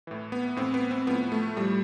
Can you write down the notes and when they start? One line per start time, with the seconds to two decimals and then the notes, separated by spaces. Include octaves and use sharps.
0.07 A2 E3
0.32 B3
0.56 A2 E3 C4
0.74 B3
0.91 C4
1.07 A2 F3 B3
1.32 A3
1.56 A2 F3 G3